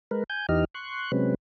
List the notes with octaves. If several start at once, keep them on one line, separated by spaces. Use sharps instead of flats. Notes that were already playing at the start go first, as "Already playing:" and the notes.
G#3 A#4 B4
G#5 G6
E2 E3 D#4 G4 D#5 F6
C6 C#6 F#6
C3 F#3 G#3 C4 C#4 B4